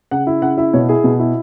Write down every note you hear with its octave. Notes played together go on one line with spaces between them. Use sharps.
C#3 F#5
E4
C#3 F#5
E4 E5
B2 C#5
E4 G#4
B2
E4